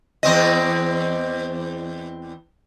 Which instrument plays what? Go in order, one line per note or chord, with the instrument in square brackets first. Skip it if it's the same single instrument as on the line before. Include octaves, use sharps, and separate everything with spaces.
[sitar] E2 C4 D#5